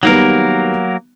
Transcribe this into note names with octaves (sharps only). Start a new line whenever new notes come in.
D#3 F#3 G3 A#3 B3 A#4